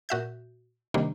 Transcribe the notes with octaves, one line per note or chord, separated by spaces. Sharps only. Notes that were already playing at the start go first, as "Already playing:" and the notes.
A#2 F#4 E5 G6
C3 D#3 G3 A#3 D4